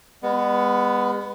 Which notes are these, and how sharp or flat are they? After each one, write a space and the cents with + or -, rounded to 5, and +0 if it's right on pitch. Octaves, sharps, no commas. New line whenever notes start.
G#3 -40 B3 +5